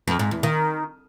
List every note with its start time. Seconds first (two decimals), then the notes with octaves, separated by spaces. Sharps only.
0.08 F2
0.19 G#2
0.31 E2
0.43 D#3